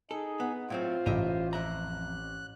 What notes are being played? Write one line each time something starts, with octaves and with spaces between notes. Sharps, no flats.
D#4 G#4 A4
B3
A2 F#3 C4 F4 C5
A1 G4 D#5 E5
F2 E5 A#5 F#6